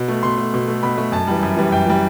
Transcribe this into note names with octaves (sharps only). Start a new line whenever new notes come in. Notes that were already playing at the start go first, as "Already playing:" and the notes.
Already playing: B2
A3
B2 C6
A3
B2
A3
B2 B5
A3
F#2 A5
E3 G3
F#2
E3 G3
F#2 G5
E3 G3